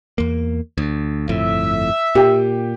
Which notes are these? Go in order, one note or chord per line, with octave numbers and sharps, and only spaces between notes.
E2 A#3
D2
G1 F2 A2 E5
A#2 G4 G5